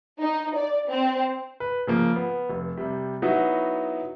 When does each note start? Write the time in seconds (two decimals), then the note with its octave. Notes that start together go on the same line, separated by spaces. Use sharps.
0.20 D#4
0.56 D5
0.89 C4
1.60 B4
1.87 C#3 F3 A#3
2.16 B3
2.50 F1
2.77 C3 G3
3.22 F#3 B3 D#4 E4 F#4